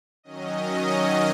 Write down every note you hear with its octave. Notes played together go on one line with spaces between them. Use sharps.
D#3 F#3 C#4 D#5